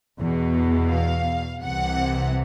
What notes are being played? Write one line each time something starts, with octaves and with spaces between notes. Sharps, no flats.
E2 B2
F5
C2 C3 E3 F#5